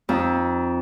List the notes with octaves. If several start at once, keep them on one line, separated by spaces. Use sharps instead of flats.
F2 D#4